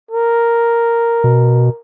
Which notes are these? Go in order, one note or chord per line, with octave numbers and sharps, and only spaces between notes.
A#4
B2